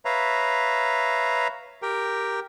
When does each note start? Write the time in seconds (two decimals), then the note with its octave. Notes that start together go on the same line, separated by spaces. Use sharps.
0.05 B4 C#5 E5 F5 A#5
1.82 G4 A#4 G5